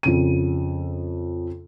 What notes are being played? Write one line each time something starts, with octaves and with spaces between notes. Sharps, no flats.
F2 C#3 D#7